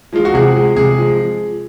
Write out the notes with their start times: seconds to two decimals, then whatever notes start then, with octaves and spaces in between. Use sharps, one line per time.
0.13 F3 G#3 F4
0.25 F#4
0.34 C3 G#4
0.56 F3 G#3
0.76 C3 G#4
0.98 F3 G#3